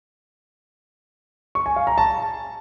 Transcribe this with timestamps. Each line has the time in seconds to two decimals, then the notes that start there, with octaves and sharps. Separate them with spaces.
1.55 C#6
1.66 G#5
1.76 F5
1.87 A#5
1.98 A5